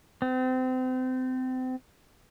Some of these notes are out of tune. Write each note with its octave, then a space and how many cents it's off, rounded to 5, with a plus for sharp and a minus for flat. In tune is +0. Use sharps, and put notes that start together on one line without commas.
C4 -30